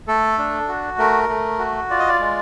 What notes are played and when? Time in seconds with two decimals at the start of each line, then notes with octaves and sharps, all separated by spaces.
0.07 A3 A4
0.38 D4
0.68 F#4
0.98 A3 A#4
1.29 A3
1.59 F#4
1.90 F4 D5
1.99 D#5
2.08 D5
2.20 G#3